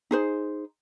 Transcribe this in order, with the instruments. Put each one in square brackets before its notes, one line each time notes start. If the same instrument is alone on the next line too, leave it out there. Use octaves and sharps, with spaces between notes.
[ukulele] D#4 G#4 C5